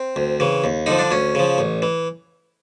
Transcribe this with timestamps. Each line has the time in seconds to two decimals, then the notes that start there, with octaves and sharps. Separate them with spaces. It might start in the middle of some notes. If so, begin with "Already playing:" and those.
Already playing: C4
0.16 D2
0.40 C#3 E3
0.64 D#2
0.86 D3 F3 D#4
0.99 D4
1.11 D2 C#4
1.35 C#3 F3
1.58 A1
1.82 E3